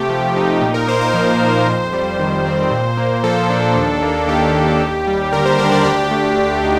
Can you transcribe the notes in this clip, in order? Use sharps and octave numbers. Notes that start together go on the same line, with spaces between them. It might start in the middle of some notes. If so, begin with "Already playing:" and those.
Already playing: C3 A3 G4
F3
D#4
A#2
A#4
A#3 C5
C5
F3
A#2
F2 C5
G3
D#3
C4
A#2
A#3
F3 A4
D4
D#2
A#3
D#3 G4
D#2
D#2
G3
D3 A#4
C5
D4 A#4
D5
D2 G4
A3
D3
D#4